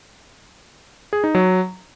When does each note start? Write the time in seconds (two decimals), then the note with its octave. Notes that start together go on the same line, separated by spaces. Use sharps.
1.13 G#4
1.24 D#4
1.35 F#3